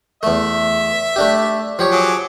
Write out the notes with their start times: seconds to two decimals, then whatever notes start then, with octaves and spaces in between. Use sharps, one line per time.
0.23 E2 A3 E5
1.16 A3 D4 G4
1.79 F3 G4 C#5
1.91 F#3 G#4 D6